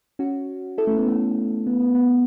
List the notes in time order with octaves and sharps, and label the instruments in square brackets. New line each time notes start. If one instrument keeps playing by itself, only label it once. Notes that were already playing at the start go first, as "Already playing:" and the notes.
[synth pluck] C#4 F#4
E4 A4
A3 C#4
B3
A3
B3
B3
B3